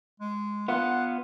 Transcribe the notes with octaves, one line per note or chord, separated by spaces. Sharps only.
G#3
B3 F4 F#5